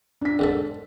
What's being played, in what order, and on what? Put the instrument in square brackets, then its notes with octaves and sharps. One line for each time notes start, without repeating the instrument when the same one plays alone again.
[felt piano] D4 B6
[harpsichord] E2 G#2 A4